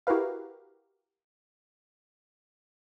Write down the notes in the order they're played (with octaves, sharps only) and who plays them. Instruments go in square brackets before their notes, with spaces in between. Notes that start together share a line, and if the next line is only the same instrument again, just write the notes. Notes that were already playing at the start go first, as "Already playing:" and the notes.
[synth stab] E4 F#4 G4 A#4 B4 F5